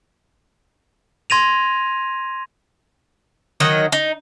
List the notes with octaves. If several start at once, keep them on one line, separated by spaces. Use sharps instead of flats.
C6 G#6 A#6 D#7 F7
D#3 F#3 D#5
D#4